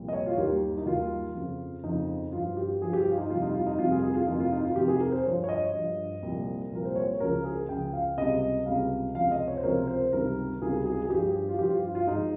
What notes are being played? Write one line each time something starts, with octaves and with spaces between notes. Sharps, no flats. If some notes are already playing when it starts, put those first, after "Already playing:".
Already playing: C2 A#2 F3
D#5
C#5
F4
D#2 D#3 G3 G4
D#4
D#2 D#3 G3 F4
F2 C#3 F3
F2 C#3 F3 D#4
G2 F3 F4
G4
G2 F3 G#4
G4
F4
D#4
F2 C3 G3 F4
D#4
F4
D#4
F2 C3 G3 F4
G#4
G#4
F4
F2 C3 D#3 D#4
F4
D#4
F4
F2 C3 D#3 G4
G#4
A#4
C5
G2 F3 C#5
C#5
D#5
G2 F3
C2 A#2 F3
C2 A#2 F3 A#4
C5
C#5
C#2 C#3 F3 A#4
G#4
C#2 C#3 F3 G5
F5
C#2 C3 G3 D#5
C#2 C3 G3 F5
C#2 C3 F3 F5
D#5
C#5
C5
C#2 C3 F3 A#4
C5
C#2 C3 D#3 G3 A#4
C#2 C3 D#3 G3 G#4
G#4
G#4
G2 F3 G4
F4
G2 F3 G4
F4
F4
F4
G#2 F3 D#4